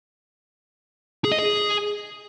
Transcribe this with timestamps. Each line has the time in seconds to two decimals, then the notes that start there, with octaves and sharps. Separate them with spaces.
1.25 G#4
1.32 D#5
1.39 G#4